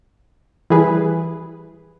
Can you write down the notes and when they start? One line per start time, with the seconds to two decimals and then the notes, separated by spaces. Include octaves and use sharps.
0.70 E3 G3 E4 G#4 B4